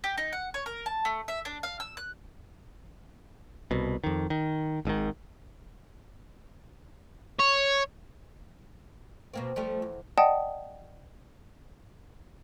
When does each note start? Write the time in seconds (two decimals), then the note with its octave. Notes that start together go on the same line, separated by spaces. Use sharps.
0.04 G4
0.18 D#4
0.33 F#5
0.54 C#5
0.66 A#4
0.86 A5
1.05 A3
1.28 E5
1.45 D4
1.63 F5
1.80 E6
1.97 F#6
3.71 C2 B2
4.04 F2 D#3
4.30 D#3
4.85 G#1 G#2 B2 D#3
7.39 C#5
9.34 B2 A#3 C4
9.56 F3 G3 A3
9.82 E2
10.18 D5 D#5 F#5 G5 A5 D#6